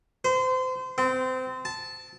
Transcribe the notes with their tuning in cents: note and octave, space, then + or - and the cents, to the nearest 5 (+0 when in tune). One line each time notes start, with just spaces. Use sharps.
C5 -30
C4 -25
A5 -5